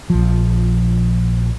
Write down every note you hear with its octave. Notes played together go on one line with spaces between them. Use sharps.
A#1 F3